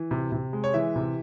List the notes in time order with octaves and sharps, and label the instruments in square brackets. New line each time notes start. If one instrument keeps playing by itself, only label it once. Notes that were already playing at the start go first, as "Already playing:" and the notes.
Already playing: [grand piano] E3
C3
C3
G#3
C#5
E3 E5
C3